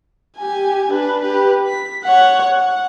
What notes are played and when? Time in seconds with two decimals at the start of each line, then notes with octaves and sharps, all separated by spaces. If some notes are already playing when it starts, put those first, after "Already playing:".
0.38 G4 G#5
0.91 D4 B4
1.22 G4 B4
1.67 B6
2.04 C#5 F#5
2.56 F#5